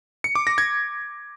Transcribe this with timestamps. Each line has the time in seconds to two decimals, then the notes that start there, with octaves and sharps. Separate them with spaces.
0.24 C#7
0.35 D6
0.47 A#6
0.58 G#6